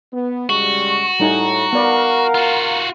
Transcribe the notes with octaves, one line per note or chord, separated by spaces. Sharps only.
B3
C#3 G3 G#3 F#4 C#6
A2 G3 D#4 G#5 A#5
B3 A#4 D5 F5 F#5
F4 F#4